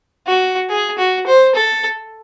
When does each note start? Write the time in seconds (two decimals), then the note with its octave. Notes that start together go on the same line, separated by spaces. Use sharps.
0.27 F#4
0.70 G#4
0.98 F#4
1.27 C5
1.55 A4